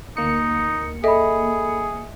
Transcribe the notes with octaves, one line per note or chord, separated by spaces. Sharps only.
D2 A#3 D#4 C#7
G#4 A4 D#5 E5 B5